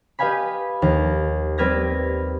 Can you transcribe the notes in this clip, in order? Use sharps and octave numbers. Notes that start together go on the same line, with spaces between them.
G4 B4 D#5 F5 G#5 B5
D#2
G3 C4 B4 F6 G#6 A#6